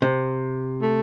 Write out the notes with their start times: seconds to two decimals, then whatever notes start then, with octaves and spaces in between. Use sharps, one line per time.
0.02 C3
0.82 A3